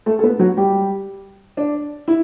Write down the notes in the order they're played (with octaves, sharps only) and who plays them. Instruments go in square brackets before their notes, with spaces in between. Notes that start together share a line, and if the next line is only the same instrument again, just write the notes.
[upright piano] A3 A4
A4
B3 B4
F#3 F#4
G3 G4
D4
E4